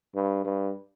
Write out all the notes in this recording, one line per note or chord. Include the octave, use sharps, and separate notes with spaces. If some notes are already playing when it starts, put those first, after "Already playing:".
G2
G2